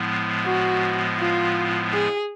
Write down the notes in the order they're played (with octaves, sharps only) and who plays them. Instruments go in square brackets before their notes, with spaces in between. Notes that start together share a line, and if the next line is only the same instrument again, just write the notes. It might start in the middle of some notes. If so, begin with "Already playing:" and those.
Already playing: [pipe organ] A2 F3 G#3 B3
[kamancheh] F#4
F4
G#4